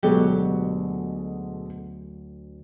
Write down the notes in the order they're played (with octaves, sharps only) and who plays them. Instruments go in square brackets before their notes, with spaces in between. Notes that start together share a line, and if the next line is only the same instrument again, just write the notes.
[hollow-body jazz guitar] D2 F#3 G4 [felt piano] B2 G#3 A4